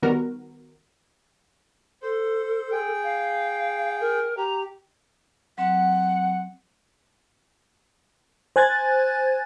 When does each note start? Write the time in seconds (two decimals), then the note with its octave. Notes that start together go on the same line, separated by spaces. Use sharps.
0.02 D#3 G3 B3 F#4 A#4
2.02 A4 C5
2.72 G#4 G5
3.03 F5
4.00 A#4
4.37 G4 A#5
5.58 F#3 C4 F#5
8.56 C5 G#5 F#6 G#6 A6